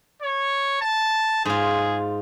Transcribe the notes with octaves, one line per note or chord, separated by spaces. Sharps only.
C#5
A5
G#2 F4 G#4